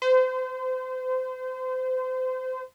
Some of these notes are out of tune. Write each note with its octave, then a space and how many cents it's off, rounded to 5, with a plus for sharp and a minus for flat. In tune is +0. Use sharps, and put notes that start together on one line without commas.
C5 -30